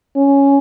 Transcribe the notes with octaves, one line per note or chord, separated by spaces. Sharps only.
C#4